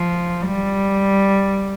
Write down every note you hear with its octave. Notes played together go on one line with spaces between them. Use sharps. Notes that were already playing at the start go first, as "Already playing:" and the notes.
Already playing: F3
G3